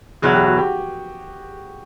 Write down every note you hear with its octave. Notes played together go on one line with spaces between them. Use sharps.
E2 B2 F#3 G#4
G4
F#4
G4